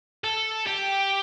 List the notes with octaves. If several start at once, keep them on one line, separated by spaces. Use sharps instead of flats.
A4
G4